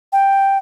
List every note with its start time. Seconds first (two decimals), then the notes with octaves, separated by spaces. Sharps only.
0.12 G5